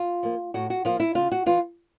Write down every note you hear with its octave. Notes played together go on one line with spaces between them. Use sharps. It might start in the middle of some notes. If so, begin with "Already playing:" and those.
Already playing: F4
F3 A#3
A2 F#4
F#4
F3 A#3 F4
E4
C#3 F4
F#4
E3 F4